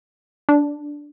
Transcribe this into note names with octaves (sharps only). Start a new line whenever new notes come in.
D4